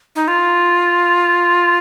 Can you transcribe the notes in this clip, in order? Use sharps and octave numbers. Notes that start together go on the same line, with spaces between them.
D#4
F4